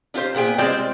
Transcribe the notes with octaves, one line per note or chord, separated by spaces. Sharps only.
D4 F4 G4 C5
A#2 B3 G#4 G5
G3 G#3 C4 F4 C5 D5